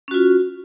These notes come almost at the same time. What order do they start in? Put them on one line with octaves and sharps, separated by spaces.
C#4 F#4 F4